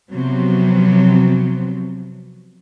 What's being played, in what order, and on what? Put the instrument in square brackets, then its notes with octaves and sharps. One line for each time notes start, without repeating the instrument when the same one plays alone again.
[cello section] C3 F3 F#3 B3 C4